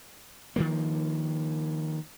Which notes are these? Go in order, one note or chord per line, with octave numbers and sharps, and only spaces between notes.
D#3 F3 A#3